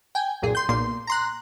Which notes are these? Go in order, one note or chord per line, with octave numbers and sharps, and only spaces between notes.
G5 G#5
C2 F#2 A#2 G#4
C6 G6
B1 A#2 A#3 C6
A#5 C6 F#6